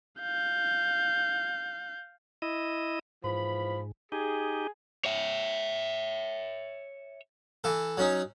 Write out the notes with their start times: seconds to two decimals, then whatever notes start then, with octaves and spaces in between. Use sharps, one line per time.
0.20 F5 G6
2.42 E4 D#5
3.24 G#2 E3 F3 B5
4.12 D#4 G4 G#4
5.05 C#5 E5
7.64 E3 A4
7.97 F#3 C#4 D#4